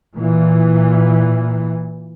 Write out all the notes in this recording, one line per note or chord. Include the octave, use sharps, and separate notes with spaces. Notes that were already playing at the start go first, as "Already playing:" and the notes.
A#2 E3